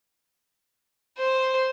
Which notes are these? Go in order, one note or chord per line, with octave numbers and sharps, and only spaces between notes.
C5